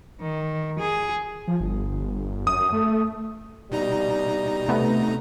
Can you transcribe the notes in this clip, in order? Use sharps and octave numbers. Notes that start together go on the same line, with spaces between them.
D#3
G#4
F3
G1
G1
F#2 D#6
A3
B2 G3 D#4 A#5
C3 A3 B3